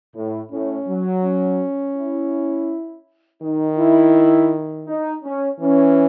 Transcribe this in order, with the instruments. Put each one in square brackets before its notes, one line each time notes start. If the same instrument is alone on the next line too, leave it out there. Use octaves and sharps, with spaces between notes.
[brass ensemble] A2
[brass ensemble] A2 [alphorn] C#4
[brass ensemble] F#3
[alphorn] C#4
[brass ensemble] E4
[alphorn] D#3 [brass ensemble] D#4
[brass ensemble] E4
D#4
C#4
[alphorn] E3 [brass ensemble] C#4